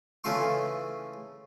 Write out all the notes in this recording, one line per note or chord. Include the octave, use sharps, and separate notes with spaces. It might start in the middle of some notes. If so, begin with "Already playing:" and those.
C#3 E3 A3 F4 C6 C#6